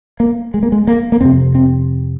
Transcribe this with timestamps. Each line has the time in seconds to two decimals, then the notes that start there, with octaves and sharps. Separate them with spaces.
0.20 A#3
0.54 G#3
0.63 A#3
0.72 G#3
0.87 A#3
1.12 A#3
1.21 F2 C3 C4
1.55 C4